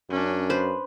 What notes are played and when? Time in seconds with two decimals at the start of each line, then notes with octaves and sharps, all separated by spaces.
0.10 F#2 C#4 D4
0.50 B4 C5